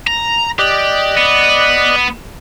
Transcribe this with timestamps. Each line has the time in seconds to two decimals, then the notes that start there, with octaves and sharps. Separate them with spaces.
0.07 A#5
0.59 G4 D5 D#5 F#6
1.17 B3